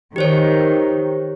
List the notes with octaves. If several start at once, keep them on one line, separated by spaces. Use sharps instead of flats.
D#3 G4 C5 C#5